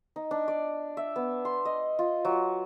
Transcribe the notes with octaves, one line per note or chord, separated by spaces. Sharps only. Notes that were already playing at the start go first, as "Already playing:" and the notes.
D#4
D4
D5
E5
B3
C6
D#5
F4
F#3